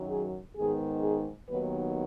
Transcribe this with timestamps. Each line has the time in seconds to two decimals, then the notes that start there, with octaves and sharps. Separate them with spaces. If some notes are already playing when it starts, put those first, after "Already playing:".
Already playing: F#2 D#3 F#3
0.10 G#4
0.56 G#2 D#3 B3 G#4
1.02 G#4
1.49 D#2 D#3 F#3 B3 B4